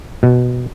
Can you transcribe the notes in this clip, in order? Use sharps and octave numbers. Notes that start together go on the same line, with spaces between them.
B2